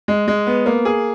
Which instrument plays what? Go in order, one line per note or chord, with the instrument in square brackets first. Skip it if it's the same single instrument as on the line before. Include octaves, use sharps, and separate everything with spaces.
[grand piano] G#3
G#3
B3
A#3
G#4